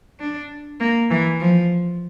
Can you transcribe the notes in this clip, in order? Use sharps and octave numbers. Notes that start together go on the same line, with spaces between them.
D4
A#3
E3
F3